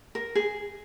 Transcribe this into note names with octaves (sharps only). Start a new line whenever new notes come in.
A#4
G#4